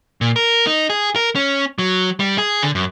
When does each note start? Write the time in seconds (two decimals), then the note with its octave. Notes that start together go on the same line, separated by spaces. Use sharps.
0.21 A#2
0.36 A#4
0.67 D#4
0.90 G#4
1.16 A#4
1.36 C#4
1.79 F#3
2.20 G3
2.38 G#4
2.63 D3
2.75 F#2